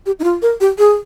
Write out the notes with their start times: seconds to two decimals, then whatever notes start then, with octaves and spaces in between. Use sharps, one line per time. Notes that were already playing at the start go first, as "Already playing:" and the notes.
0.06 G4
0.20 D#4
0.24 F4
0.42 A#4
0.61 G4
0.78 G#4